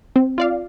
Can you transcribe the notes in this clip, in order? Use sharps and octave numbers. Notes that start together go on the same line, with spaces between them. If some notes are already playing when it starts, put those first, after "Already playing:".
C4
F4 D5 F5